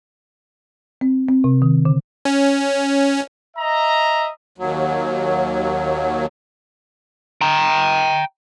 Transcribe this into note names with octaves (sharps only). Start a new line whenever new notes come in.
C4
C4
C3
D#3
D3
C#4
D#5 E5 A#5
D#2 F#3
G5 A#5